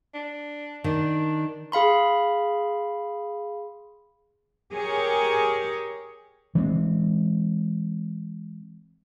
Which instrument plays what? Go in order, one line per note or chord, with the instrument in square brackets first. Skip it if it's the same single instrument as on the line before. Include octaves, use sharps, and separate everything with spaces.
[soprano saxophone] D4
[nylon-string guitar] D#3 [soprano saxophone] D4
[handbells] G#4 F5 B5 C6
[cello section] G4 G#4 A#4 C#5
[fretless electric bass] E3 G#3 B3 C4